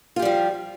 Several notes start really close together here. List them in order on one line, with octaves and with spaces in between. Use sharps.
F4 G4 G3 F3